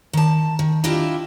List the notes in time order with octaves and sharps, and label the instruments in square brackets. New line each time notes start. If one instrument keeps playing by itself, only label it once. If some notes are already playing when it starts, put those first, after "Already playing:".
[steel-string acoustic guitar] D#3 A5
D#3
D4 E4 F4 G4 D#5 E5